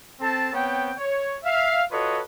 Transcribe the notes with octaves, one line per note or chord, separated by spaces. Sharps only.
C4 A4 A5
B3 C4 C#5 G5
C#5
E5 F5
F4 F#4 A4 B4 C#5 D#5